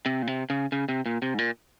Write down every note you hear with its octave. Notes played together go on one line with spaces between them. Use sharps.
C3
A#2
C3
C#3
C#3
C3
A#2
C3
G#2
A#2